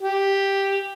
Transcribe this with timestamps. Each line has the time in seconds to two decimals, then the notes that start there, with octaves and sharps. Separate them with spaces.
0.02 G4